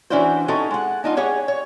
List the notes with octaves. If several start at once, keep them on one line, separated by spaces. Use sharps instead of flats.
E3 C#4 D4 E4 F#4 C5
C4 C#4 D#4 E4 F#4 A4
G#3 F#5
D4 D#4 F4
G4 G#4 C#5 F#5
C#5